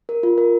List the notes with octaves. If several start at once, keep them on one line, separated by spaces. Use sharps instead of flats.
A#4
F4
A#4